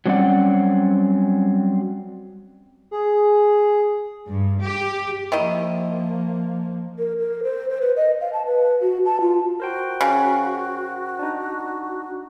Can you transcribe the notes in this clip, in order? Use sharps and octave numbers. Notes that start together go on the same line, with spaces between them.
F#3 G3 C4 C#4 D5 F#5
G#4
G2
G4
D#3 F3 A#3 E4 D#5
A#4
A#4
C5
C5
B4
D#5
F5
A5
B4
F#4
A5
F4
F#4 A#4 C5 G5
C#3
D4 D#4